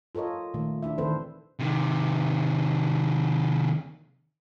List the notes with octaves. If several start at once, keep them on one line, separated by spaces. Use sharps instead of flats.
F4 A4 A#4 C#5 D#5
A#2 D#3 A3
D4 E4 E5
D#3 E3 C4 A4 B4 C5
C3 D#3